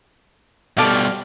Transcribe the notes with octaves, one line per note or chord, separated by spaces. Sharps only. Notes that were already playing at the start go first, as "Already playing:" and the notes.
B2 G3 A4 D5 F5